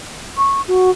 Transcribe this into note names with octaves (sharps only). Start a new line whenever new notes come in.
C#6
F#4